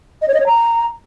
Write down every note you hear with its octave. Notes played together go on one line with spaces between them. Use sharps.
D#5
C#5
D#5
C#5
A#5